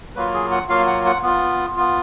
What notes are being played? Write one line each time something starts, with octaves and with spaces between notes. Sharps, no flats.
F#3 A#3 F4 B4
G#4
F#5
F#3 A#3 F4 F5
F#5
F#5
B3 F4
B3 F4